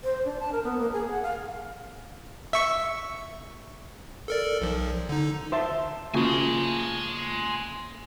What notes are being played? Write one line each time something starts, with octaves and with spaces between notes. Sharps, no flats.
C5
D4
A5
A#4
B3
A#3
G#4
F#5
F5
E5 C#6
A4 A#4 D5
B1 F3
D3 D#4
C5 E5 A5 C6
C#3 F3 A#3 G#5 C6